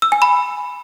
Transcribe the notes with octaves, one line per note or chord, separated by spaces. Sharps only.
E6
G#5
B5